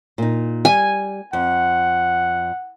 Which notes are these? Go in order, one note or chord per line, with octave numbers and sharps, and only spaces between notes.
A#2 D#4
G3 G#5
F2 F#5